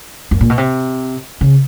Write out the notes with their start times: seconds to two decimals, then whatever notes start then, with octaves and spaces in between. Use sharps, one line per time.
0.31 F#2
0.41 A#2
0.50 B2
0.58 C3
1.41 C#3